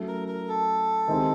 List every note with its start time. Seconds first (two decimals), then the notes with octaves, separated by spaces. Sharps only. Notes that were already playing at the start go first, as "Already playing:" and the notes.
Already playing: F#3 A3 C#4 E4
0.08 A#4
0.28 A#4
0.48 A4
1.08 D#3 G#3 C4 E4 G4